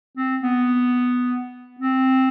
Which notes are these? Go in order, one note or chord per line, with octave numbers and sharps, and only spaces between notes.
C4
B3
C4